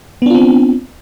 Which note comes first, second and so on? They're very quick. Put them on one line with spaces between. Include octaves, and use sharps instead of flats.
B3 D4 F4 C4